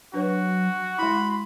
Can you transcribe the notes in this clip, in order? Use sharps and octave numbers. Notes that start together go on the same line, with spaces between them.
F#3 D4 F#4 B4 C#5
G#3 E4 B5 C6